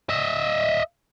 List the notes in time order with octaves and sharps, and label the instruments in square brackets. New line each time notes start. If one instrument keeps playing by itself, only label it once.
[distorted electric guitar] D#5 E5